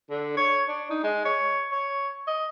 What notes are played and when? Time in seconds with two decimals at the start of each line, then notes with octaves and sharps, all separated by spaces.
0.10 D3
0.37 C#5
0.68 D4
0.90 D#4
1.03 G#3
1.25 C#5
1.72 C#5
2.27 D#5